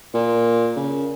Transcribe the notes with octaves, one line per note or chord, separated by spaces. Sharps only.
A#2
C#3